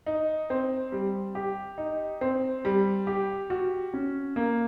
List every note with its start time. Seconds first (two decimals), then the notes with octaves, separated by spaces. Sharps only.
0.06 D#4
0.50 C4
0.92 G3
1.35 G4
1.78 D#4
2.21 C4
2.65 G3
3.07 G4
3.50 F#4
3.94 C#4
4.36 A#3